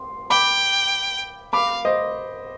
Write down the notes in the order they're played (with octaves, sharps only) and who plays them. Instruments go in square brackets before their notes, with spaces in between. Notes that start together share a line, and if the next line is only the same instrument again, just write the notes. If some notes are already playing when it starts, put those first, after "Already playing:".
Already playing: [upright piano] C6
[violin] G5 [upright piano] B5 D6
[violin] F5 [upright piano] B5 D6
[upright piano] C5 D#5